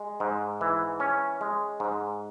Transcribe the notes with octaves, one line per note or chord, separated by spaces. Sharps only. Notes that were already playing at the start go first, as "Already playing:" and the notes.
Already playing: G#3
G#2
E3
C#4
G#3
G#2